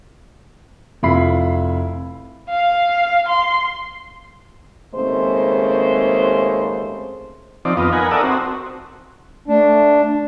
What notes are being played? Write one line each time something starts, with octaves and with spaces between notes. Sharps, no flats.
F1 E4 F4 B5 C7
F5
C6
D#2 C#3 G#3 A3 C4 C5
F3 C4 D#4 D5
F2 B3 F4 D#5
D#4 A#4 B4 F#5 G#5
A4 A#4 D5 E5 F#5 D#6
C4 F#4
A3 D4